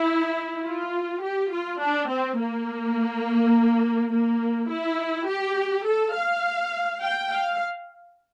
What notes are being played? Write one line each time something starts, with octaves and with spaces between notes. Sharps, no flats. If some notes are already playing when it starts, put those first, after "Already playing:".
Already playing: E4
F4
G4
F4
D4
C4
A#3
A#3
E4
G4
A4
F5
G5
F5